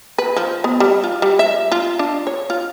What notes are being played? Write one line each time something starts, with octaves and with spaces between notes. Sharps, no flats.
B4
F3
B3
G3
F4
G3
E5
F4
D4
C#5
F4